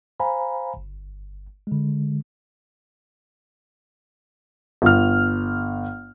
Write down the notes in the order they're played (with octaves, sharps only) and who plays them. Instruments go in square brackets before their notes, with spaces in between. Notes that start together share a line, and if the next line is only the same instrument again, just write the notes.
[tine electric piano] C5 F5 G#5 A#5 B5
G1
D3 G#3
[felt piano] G1 F6